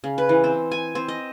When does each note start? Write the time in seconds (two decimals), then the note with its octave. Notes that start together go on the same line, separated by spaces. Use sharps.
0.04 C#3
0.18 B4
0.29 E3
0.44 C4
0.71 G#5
0.95 C4
1.08 D#5